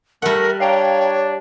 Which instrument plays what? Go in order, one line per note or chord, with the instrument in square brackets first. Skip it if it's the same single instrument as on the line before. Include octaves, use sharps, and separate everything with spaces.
[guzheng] G3 F#5 [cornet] A3 [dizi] A#4
[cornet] D4 [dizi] C#5 [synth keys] F5 G5 A#5